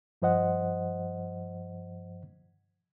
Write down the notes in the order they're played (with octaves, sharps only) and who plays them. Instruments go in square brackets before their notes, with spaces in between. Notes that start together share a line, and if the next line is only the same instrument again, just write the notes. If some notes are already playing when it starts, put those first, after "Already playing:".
[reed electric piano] G2 F3 C5 D#5 F#5